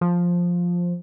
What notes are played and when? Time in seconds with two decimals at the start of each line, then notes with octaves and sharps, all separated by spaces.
0.01 F3